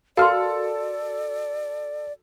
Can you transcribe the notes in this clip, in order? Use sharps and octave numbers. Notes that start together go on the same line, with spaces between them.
F#4 A4 A#4 D5 F5 C6 F6